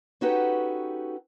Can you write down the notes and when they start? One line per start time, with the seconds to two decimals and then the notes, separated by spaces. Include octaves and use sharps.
0.21 C#4 D#4 F#4 G4 A4 B4